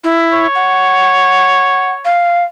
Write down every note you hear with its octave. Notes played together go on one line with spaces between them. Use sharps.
E4
C#5
F#5
F5